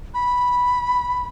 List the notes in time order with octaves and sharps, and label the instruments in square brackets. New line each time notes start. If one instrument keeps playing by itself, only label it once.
[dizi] B5